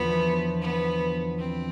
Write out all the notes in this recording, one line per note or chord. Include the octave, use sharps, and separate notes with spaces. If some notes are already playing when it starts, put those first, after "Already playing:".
Already playing: E2 D3 F3 B3
B3
C4